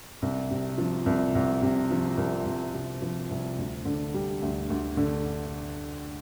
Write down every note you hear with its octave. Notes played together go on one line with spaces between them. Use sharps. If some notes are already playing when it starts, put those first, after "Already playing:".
C2
C3
F3
C2
C2
C3
F3
C2
C2
C3
F3
C2
D2
D3
G3
D2
D2
D3